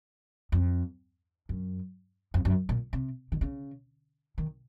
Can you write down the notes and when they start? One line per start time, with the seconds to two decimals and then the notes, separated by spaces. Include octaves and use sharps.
0.52 F2
1.49 F#2
2.34 F2
2.45 F#2
2.69 A#2
2.93 C3
3.32 D#3
3.41 C#3
4.38 D#3